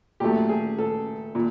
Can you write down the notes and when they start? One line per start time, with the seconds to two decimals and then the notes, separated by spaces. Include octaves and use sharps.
0.20 A#2 F#3 A3 G4
0.49 G#4
0.78 A4
1.35 A#2